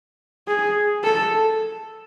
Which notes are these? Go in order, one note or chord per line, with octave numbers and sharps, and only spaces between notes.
G#4
A4